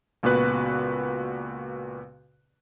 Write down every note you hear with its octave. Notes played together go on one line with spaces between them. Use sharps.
C#2 A#2 B3 F#4 B4 F#6